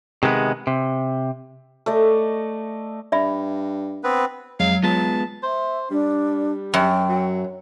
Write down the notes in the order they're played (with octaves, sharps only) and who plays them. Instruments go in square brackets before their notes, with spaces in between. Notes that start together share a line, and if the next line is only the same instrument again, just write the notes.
[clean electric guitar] C3 D#3 G#3 B3
C3
[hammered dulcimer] A3 D5 D#5
[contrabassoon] G2 [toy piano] D5 E5 B5
[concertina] B3 C4 B4
[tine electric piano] F2 G#3 [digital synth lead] F#3 [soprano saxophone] F5
[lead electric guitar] G#3 B3 [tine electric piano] F4 [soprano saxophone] A5
[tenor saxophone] C5 [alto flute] E5
[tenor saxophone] G3 [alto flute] D4
[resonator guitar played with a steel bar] F#2 [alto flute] G5
[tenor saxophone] F#3